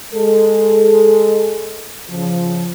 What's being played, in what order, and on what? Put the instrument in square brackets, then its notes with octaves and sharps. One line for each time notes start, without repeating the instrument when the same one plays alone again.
[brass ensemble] G#3 A4
C#3 F3